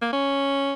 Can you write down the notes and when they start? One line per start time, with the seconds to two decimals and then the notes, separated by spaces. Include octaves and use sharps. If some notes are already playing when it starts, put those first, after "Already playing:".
0.02 A#3
0.13 C#4